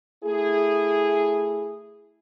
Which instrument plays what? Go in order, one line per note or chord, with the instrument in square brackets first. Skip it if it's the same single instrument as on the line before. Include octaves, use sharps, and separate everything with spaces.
[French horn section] A3 E4 G#4